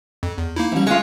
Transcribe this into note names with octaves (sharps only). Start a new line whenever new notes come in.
F2
E2
A#3 D#4 E4
A1 G3
G#3 F4 C#5